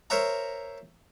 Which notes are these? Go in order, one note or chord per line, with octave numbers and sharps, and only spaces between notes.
A#4 C5 C#5 E5 A#5